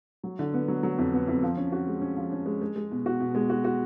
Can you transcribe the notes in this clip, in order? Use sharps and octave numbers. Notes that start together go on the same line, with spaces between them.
F#3
D3
B3
F#3
F#3
F2
B3
F2
F3
C#4
F#4
G#3
C#4
F3
C#4
G#3
G#3
G#3
B2
F#4
B2
G#3
F#4
F#4